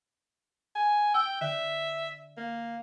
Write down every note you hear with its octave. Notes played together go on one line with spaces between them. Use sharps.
G#5
G5 E6
D3 E5
A#3